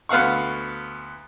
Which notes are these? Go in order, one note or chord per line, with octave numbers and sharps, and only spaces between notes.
D2 B3 F5 F#5 C#6